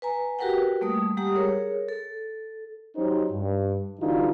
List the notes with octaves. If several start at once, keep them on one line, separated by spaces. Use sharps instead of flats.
B4 G#5 A#5
F#4 G4 A#4 B4 F#5 G5
G3 A3 A#3 D#6
G3 G#3 G4 F#5 A#5 D#6
G#4 A#4 C#5
A4
F#3 C#4 D#4 G4 C5
G2
D3 E3 G3 D#4 F4 F#4